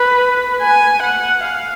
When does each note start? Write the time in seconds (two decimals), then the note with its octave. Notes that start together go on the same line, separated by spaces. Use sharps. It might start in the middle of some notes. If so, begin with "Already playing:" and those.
Already playing: B4
0.61 G#5
1.03 F#5
1.45 F5